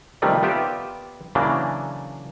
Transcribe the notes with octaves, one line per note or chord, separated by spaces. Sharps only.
C3 D#3 F3 G3 A3 A#3
B3 F4 G4 D5 E5
C#3 E3 F#3 A#3 D4